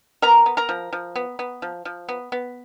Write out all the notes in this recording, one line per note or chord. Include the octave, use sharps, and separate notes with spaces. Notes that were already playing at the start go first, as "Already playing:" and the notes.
B3 A#4 A#5
B3
A#4 A#5
F3
F3
B3
B3
F3
F3
B3
B3